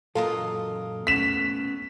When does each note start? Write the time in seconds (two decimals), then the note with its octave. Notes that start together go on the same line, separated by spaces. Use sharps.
0.15 F#2 A#2 F#3 F4 A4 A#4 D#5
1.07 A3 B3 C#4 B6 E7